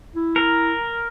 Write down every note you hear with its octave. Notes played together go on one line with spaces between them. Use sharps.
E4
A#4